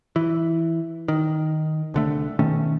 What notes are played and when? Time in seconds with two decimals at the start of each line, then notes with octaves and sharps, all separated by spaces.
0.16 E3
1.08 D#3
1.94 C2 D3 A3
2.39 B2 D#3 A3 C#4